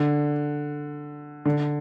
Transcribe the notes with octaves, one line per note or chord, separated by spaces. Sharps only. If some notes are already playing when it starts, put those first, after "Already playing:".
Already playing: D3
D3